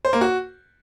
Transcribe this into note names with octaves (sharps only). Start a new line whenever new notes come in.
C5
A#3
F#4